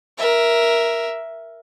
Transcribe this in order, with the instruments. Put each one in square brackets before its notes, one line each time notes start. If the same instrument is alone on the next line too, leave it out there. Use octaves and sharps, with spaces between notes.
[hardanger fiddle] A#4 E5